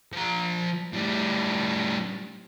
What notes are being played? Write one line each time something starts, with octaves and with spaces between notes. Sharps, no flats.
F3 A#5
A2 G3